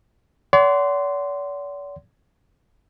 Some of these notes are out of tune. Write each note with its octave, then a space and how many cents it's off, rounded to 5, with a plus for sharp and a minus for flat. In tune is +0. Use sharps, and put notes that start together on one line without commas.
D5 -45 F#5 +25 C6 -15